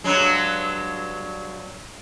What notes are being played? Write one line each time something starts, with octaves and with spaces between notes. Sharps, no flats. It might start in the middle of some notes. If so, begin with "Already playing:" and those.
G2 F#3 G#3